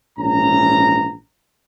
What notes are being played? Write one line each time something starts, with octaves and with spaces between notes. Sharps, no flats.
A#1 G#2 E3 C#4 A#5